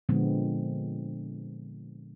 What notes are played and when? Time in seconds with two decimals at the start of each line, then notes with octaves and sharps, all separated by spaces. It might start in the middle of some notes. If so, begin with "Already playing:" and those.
0.09 A#2 D3 F3 G#3 B3 C4